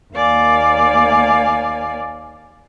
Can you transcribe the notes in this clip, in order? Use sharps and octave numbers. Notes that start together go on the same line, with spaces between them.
D#2 A#3 D5 F5 G#5